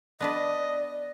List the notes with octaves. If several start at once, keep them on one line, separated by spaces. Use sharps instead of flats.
B3 D4 B4 D5 D#5